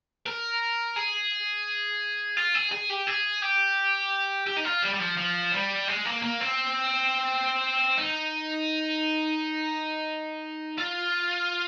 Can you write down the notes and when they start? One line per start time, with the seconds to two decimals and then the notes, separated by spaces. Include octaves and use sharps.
0.26 A#4
0.96 G#4
2.37 F4
2.54 G#4
2.72 G#4
2.90 G4
3.07 G#4
3.42 G4
4.47 G4
4.57 D#4
4.64 F4
4.82 G3
4.94 G3
5.00 F3
5.17 F3
5.52 G3
5.88 G#3
6.05 A#3
6.22 A#3
6.40 C4
7.97 D#4
10.78 F4